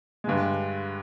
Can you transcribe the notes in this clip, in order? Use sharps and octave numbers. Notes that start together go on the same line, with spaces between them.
G2 D3 G#3